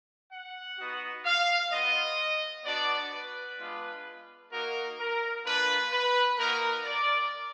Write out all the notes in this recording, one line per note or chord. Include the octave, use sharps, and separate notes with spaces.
F#5
B3 D#4 F#4
F5
B3 F4 D#5
B3 D4 F#4 D5
B4
G#3 B3 D4 F4
A#3 D#4 F#4 A#4
A#4
A#3 D4 F4 B4
B4
A#3 D#4 F#4 A#4
D5